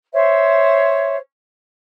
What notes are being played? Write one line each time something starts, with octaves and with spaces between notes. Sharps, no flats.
C5 C#5 E5